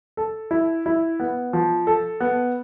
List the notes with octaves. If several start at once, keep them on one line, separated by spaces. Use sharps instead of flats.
A4
E4
E4
B3
F3
A4
B3